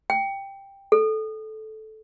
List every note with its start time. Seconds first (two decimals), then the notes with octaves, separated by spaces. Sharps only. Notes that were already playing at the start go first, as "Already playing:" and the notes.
0.10 G5
0.92 A4